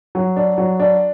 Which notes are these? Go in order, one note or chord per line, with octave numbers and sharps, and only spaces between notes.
F#3
D4
F#3
D4